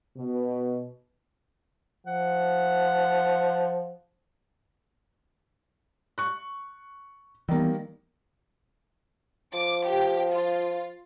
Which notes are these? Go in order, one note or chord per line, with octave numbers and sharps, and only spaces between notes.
B2
F3 F#5
C#6 F#6
D#3 E3 G3 A#3 B3
F3 D6
G4
F4